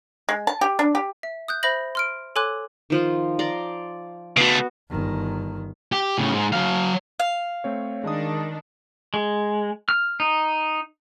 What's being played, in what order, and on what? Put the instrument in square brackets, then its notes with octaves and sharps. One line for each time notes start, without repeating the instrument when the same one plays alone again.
[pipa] G#3
A5
G4
D4
G4
[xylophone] E5
D#6 F#6 G6
C5 E5 B5 G6 A#6 F#7
C6 F6 D7
A4 C#5 G#5 C6 D6 F#6
[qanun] D#3 F3 F4
D5 A#5 C6
[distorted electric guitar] C#3 A3 [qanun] B3 F#4
[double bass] G1 D#3
[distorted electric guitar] G4
A2 C#3
G#2
F#3 F5
[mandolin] F5
[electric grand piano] A3 C4 C#5
[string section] D#3 D4 [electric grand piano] G#3 D#4 D#6
[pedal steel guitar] G#3
F6
D#4